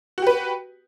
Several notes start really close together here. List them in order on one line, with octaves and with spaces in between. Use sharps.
F#4 G4 B4